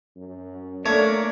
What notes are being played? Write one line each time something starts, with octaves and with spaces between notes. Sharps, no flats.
F#2
A3 A#3 D4 C#5